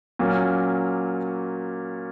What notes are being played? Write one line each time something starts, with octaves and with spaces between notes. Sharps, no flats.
A#2 F#3 A#3 C#4